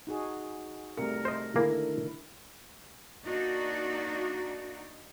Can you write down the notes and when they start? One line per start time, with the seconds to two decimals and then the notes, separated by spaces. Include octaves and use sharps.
0.07 D#4 F#4 G#4
0.98 C2 A3 A#4 C#7
1.25 C5 D#5
1.56 D3 D#3 A#3 E4 G#4 A#4
3.25 A#3 D4 D#4 F#4